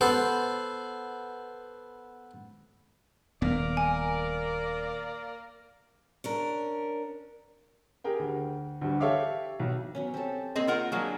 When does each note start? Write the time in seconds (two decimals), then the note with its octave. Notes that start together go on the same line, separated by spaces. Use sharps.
0.01 B3 A4 C5
3.42 D#1 A#3 B3 A#4 D5
3.77 G#5
6.24 C#4 D4 A#4
8.04 G4 G#4 A#4 G5
8.19 D2
8.81 D2 G2
9.00 G4 A4 C#5 E5 F5 D6
9.59 B1
9.95 F#3 B3 C#4
10.14 C4 G4 A4
10.55 A#3 C4 G#4 D#5
10.67 F4 A#4 F#5
10.92 F#3 G#3 A#3 D4 G#4